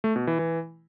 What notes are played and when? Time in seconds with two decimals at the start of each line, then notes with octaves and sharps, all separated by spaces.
0.04 A3
0.16 B2
0.27 E3
0.39 E3